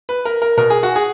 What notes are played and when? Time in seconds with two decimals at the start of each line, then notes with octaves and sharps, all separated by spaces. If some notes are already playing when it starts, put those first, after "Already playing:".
0.09 B4
0.25 A#4
0.42 A#4
0.57 B2 A#4
0.70 G#4
0.83 F#4
0.96 G#4